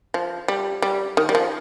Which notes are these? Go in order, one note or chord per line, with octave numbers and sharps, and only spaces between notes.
F3
G3
G3
D#3
G3
F3